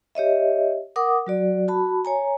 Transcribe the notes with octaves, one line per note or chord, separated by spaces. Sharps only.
G4 C#5 D#5 E5
A#4 F#5 D6 D#6
F#3 F#4 D5
F#4 A5 B5
C#5 G#5 A#5